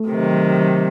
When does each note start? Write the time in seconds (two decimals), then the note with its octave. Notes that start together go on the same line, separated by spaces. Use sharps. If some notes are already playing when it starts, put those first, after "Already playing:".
Already playing: A3
0.08 C3 D#3 F#3